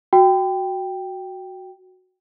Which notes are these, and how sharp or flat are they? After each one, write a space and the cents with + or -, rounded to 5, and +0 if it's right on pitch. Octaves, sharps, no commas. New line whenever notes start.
F#4 +0 G5 +0